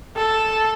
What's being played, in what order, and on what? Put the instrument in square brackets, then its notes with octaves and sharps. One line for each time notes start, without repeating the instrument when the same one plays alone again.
[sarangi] A4